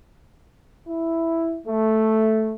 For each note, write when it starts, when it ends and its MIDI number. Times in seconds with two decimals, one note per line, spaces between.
0.88 1.58 64
1.66 2.54 57